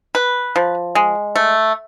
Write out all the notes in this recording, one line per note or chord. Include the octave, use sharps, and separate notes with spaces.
B4
F3
G#3
A3